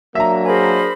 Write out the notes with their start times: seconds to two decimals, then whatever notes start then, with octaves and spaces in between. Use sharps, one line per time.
0.15 F#3 A#3 D4 E5 A#5
0.45 G#4 A#4 C5 G#5 B5